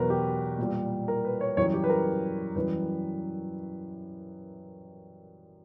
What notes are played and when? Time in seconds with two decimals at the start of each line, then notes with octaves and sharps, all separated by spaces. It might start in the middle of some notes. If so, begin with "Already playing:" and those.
Already playing: E2 B2 F#3 A#4 B4
0.10 G4
0.58 A#2 G3
1.08 A#4
1.25 B4
1.41 C#5
1.57 F#2 E3 G3 C#5
1.74 G4
1.84 B4
1.90 A#4
2.56 F#2 E3 G3 B4